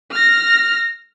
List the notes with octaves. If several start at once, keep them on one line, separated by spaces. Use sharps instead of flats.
F6 A#6